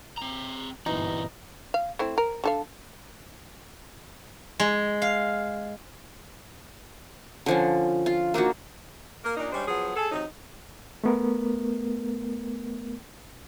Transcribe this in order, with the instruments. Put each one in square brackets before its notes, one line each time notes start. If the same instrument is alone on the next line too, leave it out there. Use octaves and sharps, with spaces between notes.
[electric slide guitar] C4 A#5
[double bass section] G1 [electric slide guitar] A#2 C4 F#4 [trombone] E3 [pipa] D#4
[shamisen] F5
A3 C4 E4
A#4
D3 A4 F5
[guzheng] G#3
F5
[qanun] D3 F3 C#4
F4
A#3 D4 D#4 F#4
[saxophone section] A#3 A#4
A#2 A#3 D4 D#4
G3 G#3 C#4 D4 C5
F3 F#3 B3 G#4
G#4 A4
C3 F#3 D#4
[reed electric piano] A3 B3 A#4